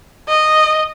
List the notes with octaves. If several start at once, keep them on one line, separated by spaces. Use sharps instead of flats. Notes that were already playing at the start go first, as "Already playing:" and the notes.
D#5